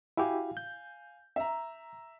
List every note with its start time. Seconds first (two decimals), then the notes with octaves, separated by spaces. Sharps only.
0.17 E4 F#4 G4 F5 G#5
0.57 G6
1.36 E5 A#5